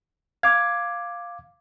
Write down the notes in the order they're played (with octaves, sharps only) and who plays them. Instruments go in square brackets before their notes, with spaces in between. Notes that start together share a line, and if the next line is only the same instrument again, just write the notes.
[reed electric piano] F5 D6 [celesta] G#6